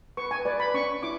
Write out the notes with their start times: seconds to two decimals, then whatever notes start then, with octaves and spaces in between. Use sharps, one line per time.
0.17 B4 C#6
0.31 G#5
0.45 B4 D5
0.60 B5
0.74 C#4 C#6
1.03 E4 D6